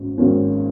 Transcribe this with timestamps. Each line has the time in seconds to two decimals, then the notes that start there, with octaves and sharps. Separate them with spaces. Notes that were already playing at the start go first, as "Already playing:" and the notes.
Already playing: G#1 G#2 A#3 C#4
0.18 G#1 G#2 D#3 A#3 C#4